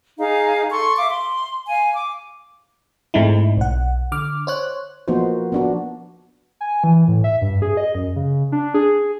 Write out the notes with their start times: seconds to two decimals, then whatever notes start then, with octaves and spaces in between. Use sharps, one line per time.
0.20 D#4 G#4 F5
0.71 A4 C6 C#6
0.98 E5 F5 D6
1.11 C6
1.69 F5 G#5
1.93 D6
3.14 G#2 G#3 A3 C4 D#4 E4
3.57 B1 F#5
4.12 D3 D6 F6
4.47 C5 C#5 F#6
5.08 F3 A#3 B3 D#4 F#4 C5
5.52 B3 D4 F#4
6.61 G#5
6.84 E3
7.08 A2
7.24 E5
7.42 G2
7.62 G#4
7.77 D#5
7.95 F#2
8.16 C#3
8.52 D4
8.74 G#4